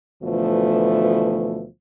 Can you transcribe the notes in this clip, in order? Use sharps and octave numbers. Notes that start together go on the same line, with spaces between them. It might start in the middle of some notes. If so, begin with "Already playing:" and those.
D2 B2 E3 F3 A3